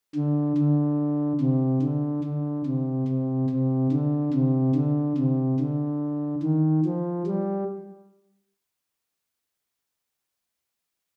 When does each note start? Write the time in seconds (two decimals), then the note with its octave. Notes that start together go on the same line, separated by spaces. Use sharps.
0.15 D3
0.58 D3
1.41 C3
1.83 D3
2.24 D3
2.66 C3
3.08 C3
3.50 C3
3.92 D3
4.34 C3
4.75 D3
5.18 C3
5.60 D3
6.43 D#3
6.85 F3
7.27 G3